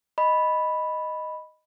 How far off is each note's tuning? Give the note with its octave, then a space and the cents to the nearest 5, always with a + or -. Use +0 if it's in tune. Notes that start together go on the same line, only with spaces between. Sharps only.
D#5 +0 B5 +0